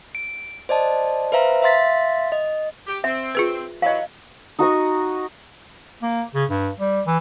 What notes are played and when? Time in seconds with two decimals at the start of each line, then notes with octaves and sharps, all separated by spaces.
0.15 D7
0.69 C5 D5 D#5 A5
1.32 B4 C5 E5 F5 A#5
1.62 E5 F5 C6 A6 B6
2.32 D#5
2.87 G4
3.04 C4 E5
3.35 F4 G#4 B4
3.82 E3 F#3 D#5 F5
4.59 D#4 F#4 D#5 C#6
6.03 A#3
6.35 C#3
6.50 G2
6.79 G3
7.07 E3